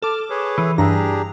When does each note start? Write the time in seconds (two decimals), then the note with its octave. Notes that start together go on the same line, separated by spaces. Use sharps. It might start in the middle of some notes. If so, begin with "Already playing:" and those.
0.02 A4 D6 F6
0.30 G#4 B4 C#5
0.58 E3
0.78 G2 D4 G4 G#4 A#5